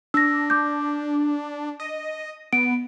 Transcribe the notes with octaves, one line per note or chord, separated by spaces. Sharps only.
D4 E6 A#6
D6 G6
D#5
B3 D7